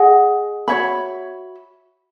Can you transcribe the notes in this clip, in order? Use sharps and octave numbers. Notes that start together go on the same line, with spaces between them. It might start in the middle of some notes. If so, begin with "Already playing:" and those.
Already playing: G#4 D#5 F#5
F#4 C#5 E5 B5